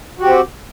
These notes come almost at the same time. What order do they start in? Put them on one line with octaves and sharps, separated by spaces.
F#4 G4 C4